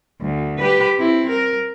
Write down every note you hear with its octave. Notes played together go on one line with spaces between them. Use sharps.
D2
G4 B4
C4 E4
A#4